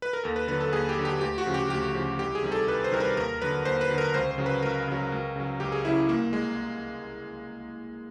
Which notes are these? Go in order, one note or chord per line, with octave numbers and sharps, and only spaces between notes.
B4
A#4
D#2 A4
B4
D3 F#3 B4
A4
D#2 G#4
G4
D3 F#3
G4
D2 G4
F#4
C#3 F3
G4
D2 G4
C#3 F3
C2 G4
G#4
C3 D#3 G3
A4
C2 B4
C5
C3 D#3 G3 A#4
B4
D#2 A#4
D3 F#3 B4
D#2 C5
B4
D3 F#3
A#4
C#2 C5
C5
C#3 F#3
B4
C#2 A#4
C#3 F#3
C#2
C#3 F#3
C#2 G4
G#4
C#3 F#3 E4
C2 A#3
G#3